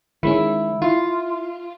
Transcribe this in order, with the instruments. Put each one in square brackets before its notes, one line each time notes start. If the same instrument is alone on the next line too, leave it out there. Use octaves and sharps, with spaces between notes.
[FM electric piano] D#3 G#3 C#4 [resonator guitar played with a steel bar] E4
[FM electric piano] E4 [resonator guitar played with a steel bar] F4